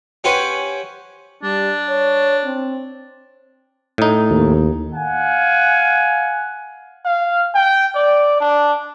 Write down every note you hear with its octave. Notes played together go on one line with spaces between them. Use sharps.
C#4 G4 B4 C5 F#5 G#5
G3 D4
C#5
C4
A2 D#4
D#2
F5 F#5 G#5
F5
G5
D5
D4